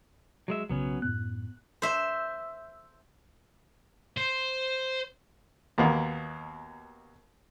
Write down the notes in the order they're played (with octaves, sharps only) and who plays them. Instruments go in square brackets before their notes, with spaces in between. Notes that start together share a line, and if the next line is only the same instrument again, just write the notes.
[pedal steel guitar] F#3 G#3 E5
[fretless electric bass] B1 C#3 [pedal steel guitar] F#3 B3 C#4
[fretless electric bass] F#2 A2 B3 [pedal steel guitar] F#6
[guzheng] C5 E5
[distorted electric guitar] C5
[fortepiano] D#2 B2 A#3 B3